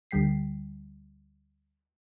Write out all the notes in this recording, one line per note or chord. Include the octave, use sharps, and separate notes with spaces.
D2 D3 G3 G5 B6 C7